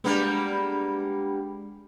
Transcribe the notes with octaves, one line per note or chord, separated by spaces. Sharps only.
G3 G#3 A#3 B3 D4